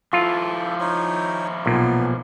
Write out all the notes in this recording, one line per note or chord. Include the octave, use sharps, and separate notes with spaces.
F3 E4 F4 A4
D#4 C5 C#5
B1 A#2 B3